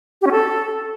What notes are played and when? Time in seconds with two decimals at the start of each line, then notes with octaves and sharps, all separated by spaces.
0.22 G4
0.27 C#4
0.32 A4